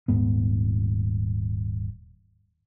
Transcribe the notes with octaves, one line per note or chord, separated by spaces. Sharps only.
D#1 G#2 B3